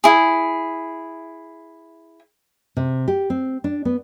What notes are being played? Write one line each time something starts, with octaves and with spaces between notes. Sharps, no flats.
E4 G#4
C3
G4
C4
D4
B3